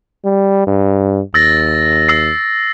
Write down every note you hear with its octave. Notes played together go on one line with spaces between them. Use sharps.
G3
G2
D#2 E6 A6 A#6
E6 C7